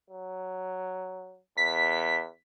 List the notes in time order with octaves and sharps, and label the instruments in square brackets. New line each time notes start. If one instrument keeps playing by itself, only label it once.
[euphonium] F#3
[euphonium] E2 [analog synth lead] B6